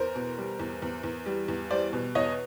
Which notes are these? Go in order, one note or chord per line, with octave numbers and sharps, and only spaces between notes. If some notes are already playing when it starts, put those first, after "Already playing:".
Already playing: E2 A#4 C5
B2
G3
E2
E2
E2
G3
E2
G3 C5 D5
B2
E2 C#5 D#5